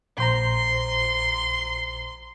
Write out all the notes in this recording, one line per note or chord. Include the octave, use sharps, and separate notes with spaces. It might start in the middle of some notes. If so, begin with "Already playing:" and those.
A#1 C5 A#5 C6